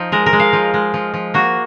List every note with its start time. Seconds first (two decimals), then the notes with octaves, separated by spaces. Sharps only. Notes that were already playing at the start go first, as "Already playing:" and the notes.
Already playing: F3 D#4
0.12 G#3 A#4
0.26 A#4
0.33 G#3
0.39 F5
0.53 F3
0.74 G#3
0.94 F3
1.14 F3
1.34 A#3 F#4